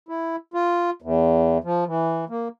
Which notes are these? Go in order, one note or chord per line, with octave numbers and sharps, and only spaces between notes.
E4
F4
E2
F3
E3
A#3